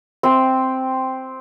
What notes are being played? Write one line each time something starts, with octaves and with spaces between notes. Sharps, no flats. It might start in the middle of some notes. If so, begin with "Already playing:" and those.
C4